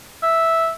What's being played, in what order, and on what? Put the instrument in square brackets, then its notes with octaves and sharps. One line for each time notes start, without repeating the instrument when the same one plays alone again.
[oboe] E5